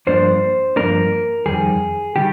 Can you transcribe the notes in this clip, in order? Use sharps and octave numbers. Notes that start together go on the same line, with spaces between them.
G2 F3 A#3 D4 C5
G2 F3 A#3 D4 A#4
F2 D#3 G3 G#4
D#3 G3 G4